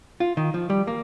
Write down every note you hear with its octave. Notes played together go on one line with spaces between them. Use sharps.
F4
D#3
F3
G3
A#3